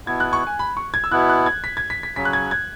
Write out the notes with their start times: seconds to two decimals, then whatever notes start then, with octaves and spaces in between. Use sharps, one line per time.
0.07 B2 B3 E4 G#6
0.20 F#6
0.33 C#6
0.47 G#5
0.59 B5
0.77 C#6
0.94 G#6
1.04 E6
1.11 B2 B3 E4 F#6
1.29 F#6
1.46 G#6
1.64 B6
1.77 G#6
1.90 B6
2.03 B6
2.16 C#3 F#3 C#4 B6
2.25 F#6
2.33 G#6
2.51 G#6